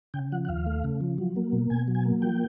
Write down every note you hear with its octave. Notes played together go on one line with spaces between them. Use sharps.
C#3 G5
F3 F#5
F#5
D#2 F5
A3
C#3
F3
F#3
A#3
B2
B2 G#5
F#3
G#5
A#3
F3 G5